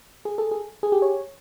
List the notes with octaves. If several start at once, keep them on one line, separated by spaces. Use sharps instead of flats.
G#4
A4
G#4
G#4
G4
C#5